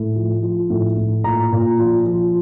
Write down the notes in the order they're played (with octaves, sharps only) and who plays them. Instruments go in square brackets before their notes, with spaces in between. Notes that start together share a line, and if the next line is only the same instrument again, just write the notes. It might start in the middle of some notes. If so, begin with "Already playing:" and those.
Already playing: [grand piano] A2
F3
F3
A2
A2
A#2 A#5
A#2
F3
F3